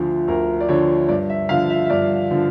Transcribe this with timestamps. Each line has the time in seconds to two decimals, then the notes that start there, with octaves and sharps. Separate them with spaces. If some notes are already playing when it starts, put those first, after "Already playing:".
Already playing: D2 D3 F3
0.28 D2 A#4
0.60 D5
0.69 D3 F3 C#5
1.09 G2 D5
1.30 E5
1.49 D3 F3 F5
1.70 E5
1.85 E5
1.90 G2 D5
2.31 D3 F3